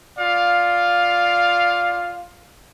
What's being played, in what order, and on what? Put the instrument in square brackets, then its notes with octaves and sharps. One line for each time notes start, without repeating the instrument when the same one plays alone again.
[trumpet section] F4 D5 F5